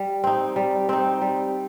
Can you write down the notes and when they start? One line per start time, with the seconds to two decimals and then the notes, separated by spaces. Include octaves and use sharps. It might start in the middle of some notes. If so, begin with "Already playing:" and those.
Already playing: G3
0.24 C4 D#4
0.56 G3
0.89 C4 D#4
1.21 G3